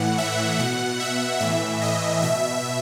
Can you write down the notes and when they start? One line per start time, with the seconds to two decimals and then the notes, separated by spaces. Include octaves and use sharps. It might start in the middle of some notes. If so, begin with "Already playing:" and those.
Already playing: A2 E3 F#5
0.18 E5
0.59 B2 F#5
1.00 E5
1.40 A2 E3 E5
1.81 D#5
2.22 B2 E5